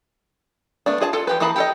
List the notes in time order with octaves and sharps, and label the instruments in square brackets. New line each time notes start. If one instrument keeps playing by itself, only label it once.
[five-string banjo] A3 B3 D4
F4 G#4 D#5 A5
F4 A4
E3 G4 B4
E3 A#3 G#4 A5 B5
G4 A4 D#5